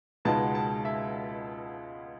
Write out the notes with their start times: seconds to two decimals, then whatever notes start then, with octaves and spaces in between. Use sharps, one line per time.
0.25 C#2 B2 G#3 B3 D#4 A5
0.55 A5
0.85 E5